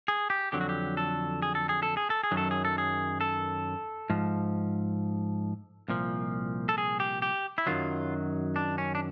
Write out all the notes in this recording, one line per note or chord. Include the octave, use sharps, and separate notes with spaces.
G#4
G4
F2 D3 F#3 G4
F#4
G4
A4
G#4
A4
G#4
A4
G#4
A4
G#4
F#2 D#3 F#3
A4
G#4
A4
G#4
A4
G#2 F3
C2 A#2 F3
A4
G#4
G4
G4
E4
F#2 D#3 F#3 F4
D4
C#4
D4